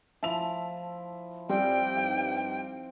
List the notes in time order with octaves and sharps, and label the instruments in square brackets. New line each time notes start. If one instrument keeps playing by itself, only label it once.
[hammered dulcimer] F3 E4 [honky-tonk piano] A5 F7
[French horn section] F2 D5 [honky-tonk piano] G3 [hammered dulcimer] C4 [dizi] G5
[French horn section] G2 D#4 [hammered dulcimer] F5